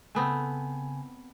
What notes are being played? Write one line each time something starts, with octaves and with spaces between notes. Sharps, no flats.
C#3 A3 B3 C4 G#5